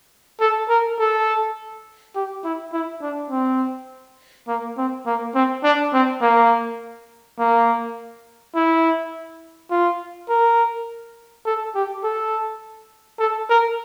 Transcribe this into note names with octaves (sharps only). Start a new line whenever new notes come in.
A4
A#4
A4
G4
E4
E4
D4
C4
A#3
C4
A#3
C4
D4
C4
A#3
A#3
E4
F4
A#4
A4
G4
A4
A4
A#4